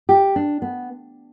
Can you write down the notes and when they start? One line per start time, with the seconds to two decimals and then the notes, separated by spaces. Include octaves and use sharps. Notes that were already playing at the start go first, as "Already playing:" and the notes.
0.09 G4
0.36 D4
0.62 B3